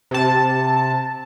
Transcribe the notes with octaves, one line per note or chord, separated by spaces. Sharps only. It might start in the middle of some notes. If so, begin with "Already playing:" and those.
C3 A5